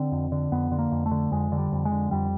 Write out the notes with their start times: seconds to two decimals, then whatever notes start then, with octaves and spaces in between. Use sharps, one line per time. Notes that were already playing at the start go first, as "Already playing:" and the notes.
Already playing: D3 C4
0.12 F2
0.32 D3
0.52 F2 B3
0.72 D3
0.79 A#3
0.92 F2
1.06 A3
1.11 D3
1.32 F2 G#3
1.52 D3
1.58 G3
1.72 F2
1.85 G#3
1.92 D3
2.11 F2 G3